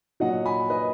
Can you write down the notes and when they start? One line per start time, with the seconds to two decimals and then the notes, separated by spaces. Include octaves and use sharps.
0.20 A#2 F#3 D#5 F#5
0.46 G#5 B5
0.70 B4 D#5